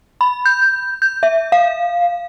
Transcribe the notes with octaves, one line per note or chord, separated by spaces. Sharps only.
B5
G6
G6
E5
F5